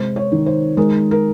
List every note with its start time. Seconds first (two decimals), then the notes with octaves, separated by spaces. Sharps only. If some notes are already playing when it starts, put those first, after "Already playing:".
Already playing: C3 G#3 C5
0.16 C#5
0.32 D#3
0.46 C5
0.77 G#3 A#4
1.11 A#4